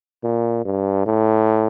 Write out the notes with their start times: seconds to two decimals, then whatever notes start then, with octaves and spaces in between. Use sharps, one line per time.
0.24 A#2
0.65 G2
1.06 A2